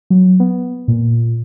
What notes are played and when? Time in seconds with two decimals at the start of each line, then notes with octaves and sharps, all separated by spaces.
0.10 F#3
0.40 B3
0.88 A#2